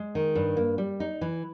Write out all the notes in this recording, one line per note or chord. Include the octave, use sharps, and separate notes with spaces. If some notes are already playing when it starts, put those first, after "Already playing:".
Already playing: G#3
D#3
G2
A#3
G3
D#4
E3